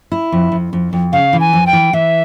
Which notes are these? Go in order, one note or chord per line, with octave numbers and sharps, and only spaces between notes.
E4
F2
F2
F2
F2
C#3 F5
E3
G#5
F2
G5
E3
E3 E5